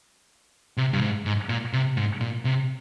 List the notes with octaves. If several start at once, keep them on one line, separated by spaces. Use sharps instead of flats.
C3
G2
G#2
G#2
A#2
C3
G#2
A#2
C3